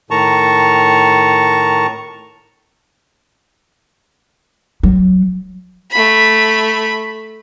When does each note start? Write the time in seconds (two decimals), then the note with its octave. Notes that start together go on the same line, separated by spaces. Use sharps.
0.11 A2 D#3 A5 A#5 C#6
4.83 F#3
5.91 A3 B5